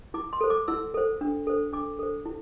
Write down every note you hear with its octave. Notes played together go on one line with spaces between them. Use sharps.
E4 D6
C6
A4 C5
D6
E4 E6
A4 C5
D4
A4 C5
D4 D6
A4 C5
E4